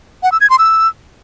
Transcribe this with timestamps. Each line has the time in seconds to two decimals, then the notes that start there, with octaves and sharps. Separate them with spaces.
0.23 F#5
0.32 E6
0.41 G#6
0.50 C6
0.59 E6